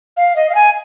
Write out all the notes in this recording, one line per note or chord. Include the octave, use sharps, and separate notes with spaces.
F5
D#5
F5
G#5